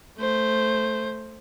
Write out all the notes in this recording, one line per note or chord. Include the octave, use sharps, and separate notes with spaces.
A3 C5